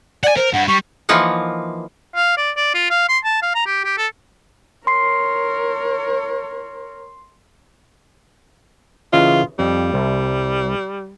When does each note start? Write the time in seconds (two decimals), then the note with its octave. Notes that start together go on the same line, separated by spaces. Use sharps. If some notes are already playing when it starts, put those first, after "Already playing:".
0.24 D5 F#5 G#5
0.37 A#4 C5
0.53 G2 F#5
0.68 G3 C#6
1.09 E3 F3 A#3 D#4 F#5
2.16 F5
2.37 D5
2.57 D5
2.75 F4
2.90 F5
3.09 C6
3.25 A5
3.43 F5
3.55 A#5
3.66 G4
3.85 G4
3.98 A4
4.87 A#4 C#5 C6 C7
9.13 C#3 E3 F4 D#5
9.59 F2 G3
9.94 C2